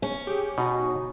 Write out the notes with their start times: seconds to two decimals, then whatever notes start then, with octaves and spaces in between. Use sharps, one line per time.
0.02 C#4
0.27 G4 G#4
0.58 B2 D#4 F#4